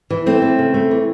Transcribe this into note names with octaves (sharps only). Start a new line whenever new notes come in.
E3
A3 C4
A3
C#3
A3
E3